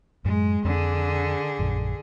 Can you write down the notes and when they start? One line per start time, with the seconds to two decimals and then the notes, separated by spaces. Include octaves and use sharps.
0.25 F#2 A2 F#3 G#3
0.64 F2 D3 C4 G#4
1.59 A#1 F#2